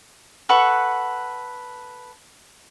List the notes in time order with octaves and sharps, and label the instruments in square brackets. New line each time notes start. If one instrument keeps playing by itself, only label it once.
[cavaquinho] A4 B4 F#5 C#6